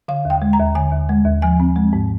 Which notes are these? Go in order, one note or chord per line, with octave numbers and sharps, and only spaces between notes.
D3 F5
D#2
G5
G#3
A#5
D#2
D3 G#5
D#2
G#3
D#2
F3 G#5
C4
G#3
G#2